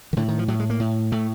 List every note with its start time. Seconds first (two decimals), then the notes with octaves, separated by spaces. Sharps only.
0.13 D#3
0.17 A2 D3
0.28 D#3
0.39 F3
0.48 A2 F#3
0.60 G#3
0.70 A#3
0.80 A2
1.12 A2 A3